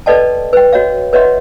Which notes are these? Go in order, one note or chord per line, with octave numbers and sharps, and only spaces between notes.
A4 B4 D5 D#5 G5 A5
B4 G5
F#4 C#5 D#5 F5
B4 C#5 D#5 E5 F#5 C6